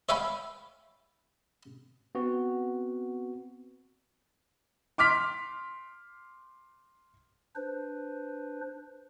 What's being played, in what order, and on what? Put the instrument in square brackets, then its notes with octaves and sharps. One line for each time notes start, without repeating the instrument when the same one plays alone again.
[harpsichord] C#5 E5 F5 G5 G#5 B5
[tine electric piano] B3 C4 F#4
[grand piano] C6 D6 F6 B6
[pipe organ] D4 B4 C5